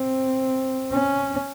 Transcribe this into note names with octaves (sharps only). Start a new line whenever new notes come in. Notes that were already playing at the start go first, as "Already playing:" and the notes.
Already playing: C4
C#4